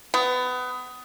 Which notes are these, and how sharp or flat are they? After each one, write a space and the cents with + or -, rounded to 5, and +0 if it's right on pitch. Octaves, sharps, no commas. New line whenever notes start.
B3 +25